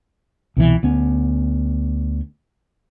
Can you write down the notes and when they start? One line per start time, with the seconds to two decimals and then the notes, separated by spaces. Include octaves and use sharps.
0.57 C2 B2 E3
0.83 D2 B3 C#4